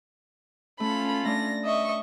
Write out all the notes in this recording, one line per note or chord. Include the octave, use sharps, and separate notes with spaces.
A3 C#4 F4 A4 B5
A3 D4 A#6
D#5 E5 C#6